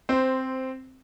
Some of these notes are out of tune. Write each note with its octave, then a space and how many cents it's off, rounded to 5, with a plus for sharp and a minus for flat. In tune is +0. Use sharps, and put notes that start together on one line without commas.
C4 +0 C5 -10